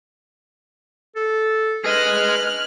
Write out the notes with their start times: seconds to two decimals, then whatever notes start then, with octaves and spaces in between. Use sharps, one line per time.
1.16 A4
1.85 G#4 B4 D#5 F6 F#6